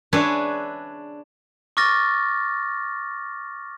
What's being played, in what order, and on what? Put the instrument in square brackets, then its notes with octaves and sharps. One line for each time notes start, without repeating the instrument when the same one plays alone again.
[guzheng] D4 G#4 B4 C#5 E5 C6
[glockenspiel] C#6 D6 F6 A6 A#6